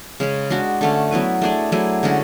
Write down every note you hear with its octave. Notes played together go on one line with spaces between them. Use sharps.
C#3 G#3 C#4
G#3 D4 F#4
D3 A3 C#4
F#3 B3 E4 B4
A3 D4 G#4 D5
F#3 A3 E4 G#4
D3 G#3 C#4 F#4